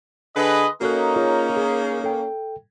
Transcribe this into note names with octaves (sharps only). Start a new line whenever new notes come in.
D3 G#3 G#4 B4 D#5
A#3 C#4 D#4 F#4 A4 F#6
F4 G#4 C#5
G#4
A4 G5